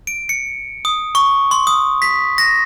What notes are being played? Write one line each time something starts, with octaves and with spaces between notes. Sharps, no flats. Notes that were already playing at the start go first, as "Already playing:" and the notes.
D7
C#7
D#6
C#6
C6
D#6
B6
A#6